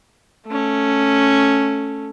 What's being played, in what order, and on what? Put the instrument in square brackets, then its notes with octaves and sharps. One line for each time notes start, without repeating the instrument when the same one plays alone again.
[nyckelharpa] A3 C#4